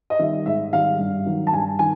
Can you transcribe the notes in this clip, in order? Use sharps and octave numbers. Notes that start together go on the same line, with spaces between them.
D#5
D#3 G3 E5
G#2 E5
D#3 G3 F5
G2
D#3 F#3
A5
G2 G#5
D#3 G#5